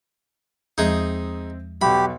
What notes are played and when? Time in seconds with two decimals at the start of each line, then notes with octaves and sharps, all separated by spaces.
0.78 E2 F3 G#3 C4 D#4 G#4 E5
1.81 B1 B2 G4 B5